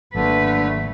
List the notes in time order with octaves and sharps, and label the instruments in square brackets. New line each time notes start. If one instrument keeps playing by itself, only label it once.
[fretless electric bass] G#1 F#3 A#3 [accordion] D3 A3 [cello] B4